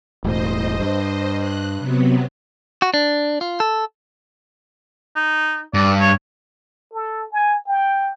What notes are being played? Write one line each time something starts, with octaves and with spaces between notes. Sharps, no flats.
E1 A2 C5 D#5
G2
F#6
C3 F#3 B3
F#4
D4
F4
A4
D#4
G2 D5
C#5
A4
G#5
G5